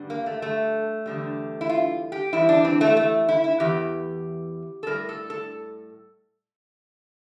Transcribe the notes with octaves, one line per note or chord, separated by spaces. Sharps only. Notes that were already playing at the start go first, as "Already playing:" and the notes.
Already playing: G2 D3 G3
A#3
A3
A3
E2 D3 G3
E4
F4
G4
E2 E3 G3 E4
D4
C4
A3
A3
E4
E4
E2 E3 G4
A4
A2 G3 A#4
A4
A4